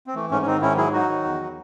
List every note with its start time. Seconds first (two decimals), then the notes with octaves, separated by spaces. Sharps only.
0.07 C4
0.15 E3 A3
0.31 G#2 A3 C#4
0.42 C#4
0.46 D#3 C4 D#4
0.62 G#2 C#4 E4
0.77 F#3 E4 G#4
0.93 F#3 D#4 F#4
1.09 D#3
1.25 E2
1.40 F#3